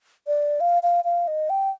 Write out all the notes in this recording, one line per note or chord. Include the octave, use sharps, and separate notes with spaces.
D5
F5
F5
F5
D#5
G5